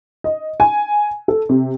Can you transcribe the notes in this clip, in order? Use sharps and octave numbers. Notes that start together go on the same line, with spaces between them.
D#5
G#5
A4
C3